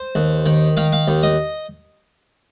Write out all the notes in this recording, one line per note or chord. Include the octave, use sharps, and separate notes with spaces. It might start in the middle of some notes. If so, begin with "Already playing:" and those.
Already playing: C5
D#2
D#3
D#3 F5
F5
D#2
D#5